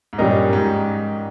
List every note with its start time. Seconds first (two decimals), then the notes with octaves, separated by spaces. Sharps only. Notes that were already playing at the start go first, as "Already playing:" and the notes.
0.13 G#2
0.18 G2 A#2 G3 C#4 G4 A#4 D#5
0.53 G#2